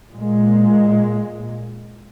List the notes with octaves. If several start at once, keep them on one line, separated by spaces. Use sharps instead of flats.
A#2 G#3